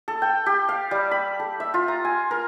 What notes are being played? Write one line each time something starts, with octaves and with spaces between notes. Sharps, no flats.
A4
G5
G4
F5
G3
B5
A4
E5
F4
A#5
G#5
A#4